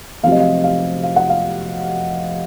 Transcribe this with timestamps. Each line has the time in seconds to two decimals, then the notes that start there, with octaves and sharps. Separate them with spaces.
0.23 F1 F2 C3 F#3 C4 F5
0.32 D#5
0.40 F5
0.64 F5
1.03 F5
1.16 F#5
1.29 F5